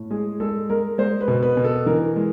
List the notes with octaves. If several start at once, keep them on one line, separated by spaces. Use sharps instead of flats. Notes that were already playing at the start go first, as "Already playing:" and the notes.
Already playing: A2
G#3 G#4
G#3 A4
G#3 A#4
G#3 C5
B4
B2
B4
B2
A4
E3 A#4
G#3